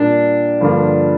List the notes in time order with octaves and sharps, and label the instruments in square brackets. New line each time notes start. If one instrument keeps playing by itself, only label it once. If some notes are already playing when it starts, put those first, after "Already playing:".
Already playing: [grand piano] A#2 G3 A#3 G4 [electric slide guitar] D4
[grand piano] G2 D3 F3 A#3 F4